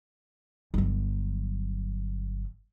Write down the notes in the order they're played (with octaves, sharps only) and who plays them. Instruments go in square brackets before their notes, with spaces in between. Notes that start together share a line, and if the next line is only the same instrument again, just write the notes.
[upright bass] G1 F#3